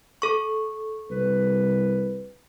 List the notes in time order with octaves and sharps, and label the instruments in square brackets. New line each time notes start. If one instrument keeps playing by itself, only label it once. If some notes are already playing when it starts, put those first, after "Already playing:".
[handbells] A4 C#6
[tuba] C2 [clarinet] B4